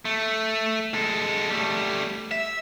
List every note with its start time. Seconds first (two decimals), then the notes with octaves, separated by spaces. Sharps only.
0.05 A3
0.94 G#3 A4
1.50 G3 A3
2.31 E5